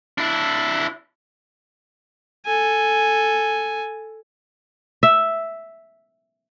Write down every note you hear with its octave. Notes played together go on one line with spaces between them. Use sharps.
D4 E4
A4 G#5
E5